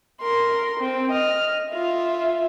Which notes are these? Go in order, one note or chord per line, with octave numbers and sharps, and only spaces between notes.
A#4 C6
C4
D#5 F6
F4 E5